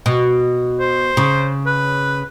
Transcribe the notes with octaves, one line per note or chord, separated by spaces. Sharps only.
B2
C5
C#3
B4